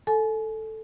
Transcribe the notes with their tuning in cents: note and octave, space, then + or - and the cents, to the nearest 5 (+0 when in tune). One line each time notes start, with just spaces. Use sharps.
A4 +0 G#5 +35